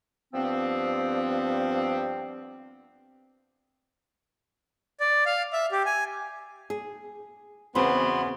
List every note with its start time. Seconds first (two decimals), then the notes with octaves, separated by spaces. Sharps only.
0.33 G2 F3 B3 C4
5.00 D5
5.26 F5
5.53 E5
5.72 G4
5.86 G#5
6.70 G#4
7.75 E2 C#3 B3 C4 F#4 B5 C6